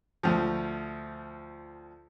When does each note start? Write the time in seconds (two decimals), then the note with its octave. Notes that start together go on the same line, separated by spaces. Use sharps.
0.23 D2 F3